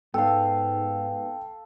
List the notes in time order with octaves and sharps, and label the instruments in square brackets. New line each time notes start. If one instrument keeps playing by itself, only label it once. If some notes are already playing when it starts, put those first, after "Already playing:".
[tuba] G#2 [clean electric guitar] B3 [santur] A4 F5 [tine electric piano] G5